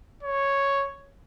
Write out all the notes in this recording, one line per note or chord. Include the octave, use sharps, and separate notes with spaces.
C#5